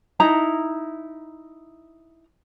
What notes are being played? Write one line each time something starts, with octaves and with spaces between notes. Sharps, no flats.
D#4 E4 A#5